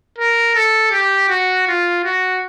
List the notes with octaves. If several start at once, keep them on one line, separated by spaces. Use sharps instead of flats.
A#4
A4
G4
F#4
F4
F#4